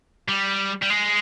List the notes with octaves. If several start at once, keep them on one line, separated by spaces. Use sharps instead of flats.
G3
G3
G#3